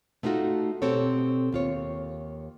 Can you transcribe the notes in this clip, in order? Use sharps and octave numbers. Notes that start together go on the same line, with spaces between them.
A3 B3 D#4 F4 F#4 A4
B2 C4 G4 A4 C#5
D#2 F4 C#5